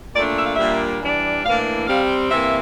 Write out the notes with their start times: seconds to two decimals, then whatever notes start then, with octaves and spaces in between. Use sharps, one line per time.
0.15 A#2 A3 D4 D5
0.37 E5
0.47 F5
0.55 A#2 G3 A#3 D4 E5
1.02 E3 G3 D4
1.45 A2 E3 A#3 D4 F5
1.88 C3 G3 C4 F5
2.31 C3 E3 A#3 E5